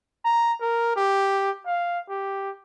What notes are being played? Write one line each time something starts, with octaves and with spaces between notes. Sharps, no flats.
A#5
A#4
G4
F5
G4